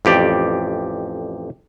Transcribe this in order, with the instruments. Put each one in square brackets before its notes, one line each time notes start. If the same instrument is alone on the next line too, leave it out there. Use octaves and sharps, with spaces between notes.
[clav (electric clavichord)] A1 F2 G4 D5